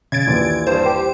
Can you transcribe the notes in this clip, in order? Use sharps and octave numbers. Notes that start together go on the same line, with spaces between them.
C#3 G#6 A6 D7
A#1 D#2 E3
G2 C5
G4